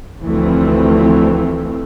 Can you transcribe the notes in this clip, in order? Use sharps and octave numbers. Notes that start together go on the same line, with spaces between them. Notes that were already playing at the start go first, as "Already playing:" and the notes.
D2 E3 F3 A3 C4